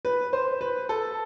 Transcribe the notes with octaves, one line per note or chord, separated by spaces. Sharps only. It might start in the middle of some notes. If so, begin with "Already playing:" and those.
B4
C5
B4
A4